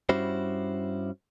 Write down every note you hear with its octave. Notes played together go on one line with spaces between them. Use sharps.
G2 G3 C#4 E4 F#4 C5